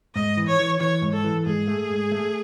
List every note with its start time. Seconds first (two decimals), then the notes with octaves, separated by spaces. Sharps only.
0.15 G#2 D#5
0.37 E3
0.47 C#5
0.59 E3
0.81 E3 C#5
1.02 G#2
1.13 A4
1.24 E3
1.46 G#2 G#4
1.67 A3
1.90 G#2
2.12 A3